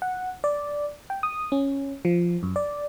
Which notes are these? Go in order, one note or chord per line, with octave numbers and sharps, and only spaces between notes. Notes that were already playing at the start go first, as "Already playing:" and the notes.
F#5
D5
G5
D#6
C#4
F3
F#2
D5